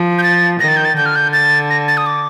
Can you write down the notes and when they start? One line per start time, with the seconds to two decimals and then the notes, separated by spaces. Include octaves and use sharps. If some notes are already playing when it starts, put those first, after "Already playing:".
Already playing: F3
0.18 G6
0.23 A6
0.60 D#3 A#6
0.68 A6
0.77 G6
0.85 A6
0.96 D3 G6
1.06 F6
1.16 G6
1.33 A6
1.70 A#6
1.88 A6
1.97 D#6
2.06 D6